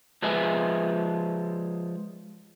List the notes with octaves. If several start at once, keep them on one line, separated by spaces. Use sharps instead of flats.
F3 G#3 B4 D#5 E5 G#5